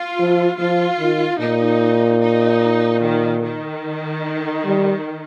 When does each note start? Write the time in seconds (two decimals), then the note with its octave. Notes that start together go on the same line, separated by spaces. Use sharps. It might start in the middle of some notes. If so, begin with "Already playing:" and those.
Already playing: F4
0.19 F3
0.59 F3 F4
0.99 D#3
1.40 A#2 D#4
2.22 D#4
3.03 D#3
3.44 D#3
4.65 G3